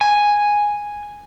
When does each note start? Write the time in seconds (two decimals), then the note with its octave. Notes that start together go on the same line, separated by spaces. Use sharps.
0.01 G#5